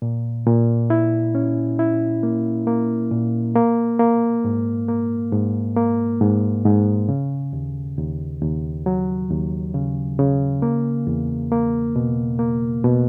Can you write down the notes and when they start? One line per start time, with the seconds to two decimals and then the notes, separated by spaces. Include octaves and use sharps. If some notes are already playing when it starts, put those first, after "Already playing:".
0.02 A#2
0.46 A#2
0.90 E4
1.35 C#4
1.79 E4
2.23 A#3
2.67 A#3
3.11 A#2
3.56 A#3
3.99 A#3
4.44 G#2
4.88 A#3
5.32 G#2
5.77 A#3
6.21 G#2
6.65 G#2
7.09 C#3
7.53 D#2
7.98 D#2
8.41 D#2
8.86 F#3
9.30 D#2
9.74 C#3
10.19 C#3
10.62 A#3
11.07 E2
11.51 A#3
11.96 B2
12.39 A#3
12.84 B2